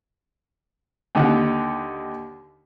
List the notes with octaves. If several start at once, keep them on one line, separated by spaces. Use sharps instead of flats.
D#2 D3 D#4 F#5